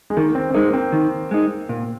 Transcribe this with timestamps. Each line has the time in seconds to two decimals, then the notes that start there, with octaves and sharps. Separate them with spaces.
0.10 G#3
0.17 D#3 A#3
0.35 C4
0.50 C4
0.54 G#3 A#3 D#4
0.73 C4
0.92 D#3
1.31 G#3 D#4
1.69 A#2